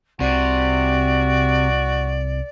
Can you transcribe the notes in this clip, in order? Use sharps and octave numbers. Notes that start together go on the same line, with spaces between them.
C2 C3 F#4 D5